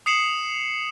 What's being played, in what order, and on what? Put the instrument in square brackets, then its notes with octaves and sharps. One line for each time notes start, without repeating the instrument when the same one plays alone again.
[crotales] D#6 C7 C#7 E7 F#7